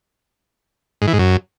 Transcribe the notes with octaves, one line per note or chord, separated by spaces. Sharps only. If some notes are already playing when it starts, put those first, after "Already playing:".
G#2
E3
G#2
F#2